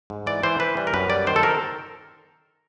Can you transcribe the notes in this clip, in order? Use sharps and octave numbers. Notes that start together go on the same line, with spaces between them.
G#2
E3 D5
E3 C5
E3 B4
G3
A#4
F#2 B4
G3 D5
D#3 C5
A4
A#4